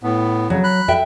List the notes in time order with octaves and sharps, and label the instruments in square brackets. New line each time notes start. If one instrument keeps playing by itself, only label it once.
[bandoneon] A2 B3
[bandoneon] C#3 [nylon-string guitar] F#3
[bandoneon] B5 F#6
[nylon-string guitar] E5 G5